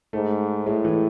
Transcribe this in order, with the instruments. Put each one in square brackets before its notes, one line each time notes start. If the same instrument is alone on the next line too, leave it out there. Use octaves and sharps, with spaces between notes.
[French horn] G#2 [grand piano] A3
[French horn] A2 [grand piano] G#3
[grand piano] E3